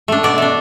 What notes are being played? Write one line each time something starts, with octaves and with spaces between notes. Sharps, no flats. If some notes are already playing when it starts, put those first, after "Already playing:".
A3 D4
B2 D5
A3 D4